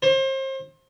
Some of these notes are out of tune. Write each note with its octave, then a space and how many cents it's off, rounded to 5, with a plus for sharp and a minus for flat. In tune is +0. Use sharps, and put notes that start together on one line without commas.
C5 +35